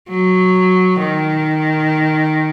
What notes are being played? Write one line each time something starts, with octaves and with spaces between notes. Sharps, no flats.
F#3
D#3